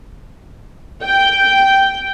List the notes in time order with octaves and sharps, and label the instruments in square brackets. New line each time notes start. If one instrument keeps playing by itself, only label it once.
[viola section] G5